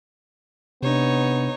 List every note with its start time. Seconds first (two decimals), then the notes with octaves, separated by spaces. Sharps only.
0.83 C3 B3 D4 D#4 C#5